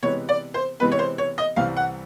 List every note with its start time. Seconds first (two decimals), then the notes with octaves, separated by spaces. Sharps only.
0.03 C3 E3 G#3 B3 C#5
0.29 D5
0.54 C5
0.80 C3 E3 G#3 B3 B4
0.92 C#5
0.99 C5
1.18 C#5
1.38 D#5
1.56 C2 C3 E3 G3 F5
1.77 F#5